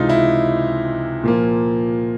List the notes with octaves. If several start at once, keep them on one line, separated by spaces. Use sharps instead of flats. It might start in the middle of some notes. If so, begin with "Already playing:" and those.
Already playing: C#2 C3 E3 G#3 D#4 F4
E4
A#2 F3 A#3